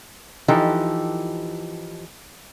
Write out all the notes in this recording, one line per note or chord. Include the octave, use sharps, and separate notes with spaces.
E3 F3 D#4 G4 A4